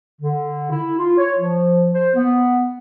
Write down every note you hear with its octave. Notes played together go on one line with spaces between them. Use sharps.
D3
E4
F4
C#5
F3
C5
B3